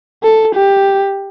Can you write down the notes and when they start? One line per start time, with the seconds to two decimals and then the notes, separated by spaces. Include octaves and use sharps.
0.23 A4
0.55 G4